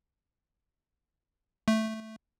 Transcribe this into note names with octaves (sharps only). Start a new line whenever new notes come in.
A3